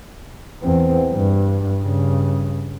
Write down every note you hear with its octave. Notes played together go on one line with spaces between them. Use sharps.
E2 C4
G2
G2 C#3